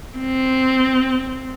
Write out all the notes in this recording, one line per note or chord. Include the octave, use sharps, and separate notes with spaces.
C4